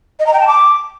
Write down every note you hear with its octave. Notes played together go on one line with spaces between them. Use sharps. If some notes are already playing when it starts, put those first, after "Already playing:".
D#5
A#5
G5
A5
D6